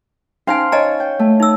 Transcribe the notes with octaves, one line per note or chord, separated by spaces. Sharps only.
C#4 D#4 C5 F5 G#5 C6
C#5 D#5 G#5 A#5
G5
A3
D#4 E6